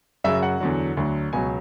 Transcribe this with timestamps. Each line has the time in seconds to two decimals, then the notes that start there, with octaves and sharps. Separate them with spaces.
0.24 F#2 C#3 F#3 E5
0.42 F#5
0.60 E2 D3 F#3
0.97 D2 D3 F#3
1.33 C#2 B2 F#3 G#5